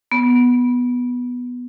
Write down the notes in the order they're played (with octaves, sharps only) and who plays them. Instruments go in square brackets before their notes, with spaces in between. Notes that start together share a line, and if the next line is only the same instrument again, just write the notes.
[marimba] B3